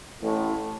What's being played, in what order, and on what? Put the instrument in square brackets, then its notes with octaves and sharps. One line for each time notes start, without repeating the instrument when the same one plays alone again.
[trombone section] A1 A2